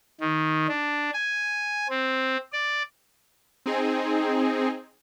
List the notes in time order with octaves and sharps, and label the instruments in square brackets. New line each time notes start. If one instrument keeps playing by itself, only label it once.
[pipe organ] D#3
D4
G#5
C4
D5
[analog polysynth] C4 D#4 G#4